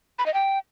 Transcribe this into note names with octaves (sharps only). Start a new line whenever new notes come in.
B5
D#5
G5